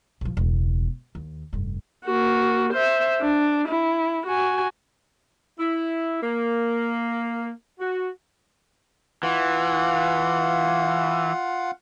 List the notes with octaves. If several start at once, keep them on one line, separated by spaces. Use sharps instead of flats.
A#1 F3
E1 C#2
D#2
F1 G2
A#3 F#4
C5 E5
D4
E4
F#4 G#5
E4
A#3
F#4
E3 F4 F5 F#5